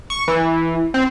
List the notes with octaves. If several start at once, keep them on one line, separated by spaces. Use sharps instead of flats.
C#6
E3
C4